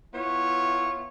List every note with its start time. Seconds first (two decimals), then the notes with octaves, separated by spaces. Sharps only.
0.13 B3 E4 F4 C#5